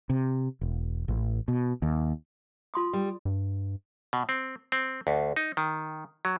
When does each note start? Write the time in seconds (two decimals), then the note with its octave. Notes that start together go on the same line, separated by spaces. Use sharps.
0.10 C3
0.61 E1
1.08 A1
1.48 B2
1.82 D#2
2.74 F4 C6 D#6
2.93 G3
3.25 G2
4.13 B2
4.29 C4
4.72 C4
5.07 D2
5.36 D#4
5.57 D#3
6.25 F#3